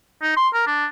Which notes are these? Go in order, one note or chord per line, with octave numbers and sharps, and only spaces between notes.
D#4
C6
A#4
D4